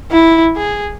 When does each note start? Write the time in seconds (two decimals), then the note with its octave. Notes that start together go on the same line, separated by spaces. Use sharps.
0.11 E4
0.57 G#4